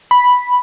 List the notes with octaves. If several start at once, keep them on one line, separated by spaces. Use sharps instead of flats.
B5